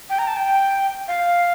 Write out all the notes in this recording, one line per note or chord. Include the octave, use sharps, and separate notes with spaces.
G5
A#5
A5
G5
F5